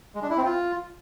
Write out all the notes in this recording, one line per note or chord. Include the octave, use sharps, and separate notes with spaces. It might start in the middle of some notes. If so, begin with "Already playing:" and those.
G#3
D4
E4
C4
F4